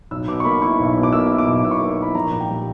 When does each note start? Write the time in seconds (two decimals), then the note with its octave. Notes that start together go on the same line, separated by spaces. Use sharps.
0.11 B1 E6
0.28 B2 D6
0.40 C#6
0.45 A#3 B5
0.62 E4 C#6
0.79 B1
0.96 B2
1.03 D6
1.12 A#3 E6
1.30 E4
1.38 D6
1.47 B1
1.64 B2 E6
1.71 C#6
1.77 D6
1.81 A#3
1.89 D6
1.98 E4 B5
2.15 A#1 A#5
2.32 A#2
2.40 G5
2.49 G3